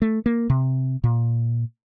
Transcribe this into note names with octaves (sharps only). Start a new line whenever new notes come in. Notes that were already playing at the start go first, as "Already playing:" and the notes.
A3
A#3
C3
A#2